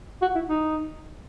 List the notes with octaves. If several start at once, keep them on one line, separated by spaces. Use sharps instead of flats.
F#4
E4
D#4